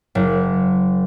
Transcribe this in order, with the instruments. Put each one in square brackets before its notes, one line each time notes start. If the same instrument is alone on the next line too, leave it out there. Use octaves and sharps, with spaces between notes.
[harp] F#1